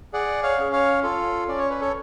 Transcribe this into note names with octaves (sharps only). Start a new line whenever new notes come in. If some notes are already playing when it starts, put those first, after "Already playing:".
G#4 D5 F#5
C#5 F5
C#4
C#5 F5
F4 A4
C#4 D5
C#5
B4
A4 C#5